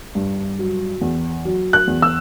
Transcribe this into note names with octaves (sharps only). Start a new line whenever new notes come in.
G2
F#3
E2
F#3
F#6
E2
E6